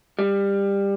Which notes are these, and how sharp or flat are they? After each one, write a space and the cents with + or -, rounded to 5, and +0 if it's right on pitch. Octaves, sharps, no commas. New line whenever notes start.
G3 +20